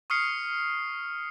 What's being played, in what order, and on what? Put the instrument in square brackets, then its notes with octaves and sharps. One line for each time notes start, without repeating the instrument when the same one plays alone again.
[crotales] C#6 D#6 F6 C7 C#7